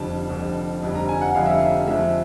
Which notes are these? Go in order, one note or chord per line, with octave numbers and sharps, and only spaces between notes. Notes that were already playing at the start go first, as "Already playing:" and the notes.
Already playing: F1 F2 D3 G3 A5
F1 F2 D3 G3
F1 F2 D3 G3
A#5
G#5
F#5
F1 F2 D3 G3 F5
E5
F5
F2 D3 F3 G#3 E5